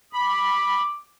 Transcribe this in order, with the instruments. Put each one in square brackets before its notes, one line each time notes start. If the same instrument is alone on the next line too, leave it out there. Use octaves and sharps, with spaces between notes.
[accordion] B5 [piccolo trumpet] D6